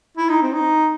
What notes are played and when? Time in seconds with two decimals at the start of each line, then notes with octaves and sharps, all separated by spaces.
0.17 E4
0.29 D#4
0.42 C4
0.54 D#4